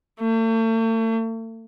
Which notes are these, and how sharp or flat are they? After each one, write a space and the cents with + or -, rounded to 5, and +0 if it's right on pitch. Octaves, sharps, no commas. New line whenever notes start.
A3 +40